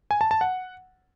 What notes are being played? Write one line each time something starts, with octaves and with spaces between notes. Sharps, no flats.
G#5
A5
A5
F#5